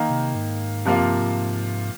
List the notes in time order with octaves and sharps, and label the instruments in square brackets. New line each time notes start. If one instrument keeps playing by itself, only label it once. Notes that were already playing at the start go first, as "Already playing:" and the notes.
Already playing: [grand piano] D#3 A#3 D#4
[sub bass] C3
G#2
[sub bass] G2 [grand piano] C3 F3 A#3 F4
[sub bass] F2
G2
G#2